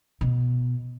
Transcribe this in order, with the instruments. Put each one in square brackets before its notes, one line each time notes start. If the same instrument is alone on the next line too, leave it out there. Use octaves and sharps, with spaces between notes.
[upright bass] B2